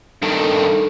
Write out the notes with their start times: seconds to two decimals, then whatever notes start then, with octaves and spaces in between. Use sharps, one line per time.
0.22 G2 D#3 A4